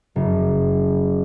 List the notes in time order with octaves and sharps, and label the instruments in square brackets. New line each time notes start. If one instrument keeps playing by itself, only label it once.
[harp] F#1